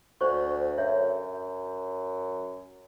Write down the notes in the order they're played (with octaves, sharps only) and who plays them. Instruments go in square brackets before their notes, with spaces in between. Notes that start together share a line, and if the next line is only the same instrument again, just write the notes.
[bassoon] D2 [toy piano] D4 C5 C#6
[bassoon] F#2 [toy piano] C#5 E5